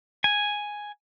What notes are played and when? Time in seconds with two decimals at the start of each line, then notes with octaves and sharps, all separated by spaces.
0.24 G#5